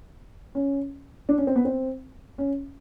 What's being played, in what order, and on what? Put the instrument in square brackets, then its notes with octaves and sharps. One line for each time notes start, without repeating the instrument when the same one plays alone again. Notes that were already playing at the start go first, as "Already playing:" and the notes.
[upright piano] C#4
D4
C#4
C4
B3
C4
C#4